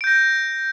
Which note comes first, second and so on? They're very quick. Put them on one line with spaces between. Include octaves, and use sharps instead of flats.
D7 G6 A#6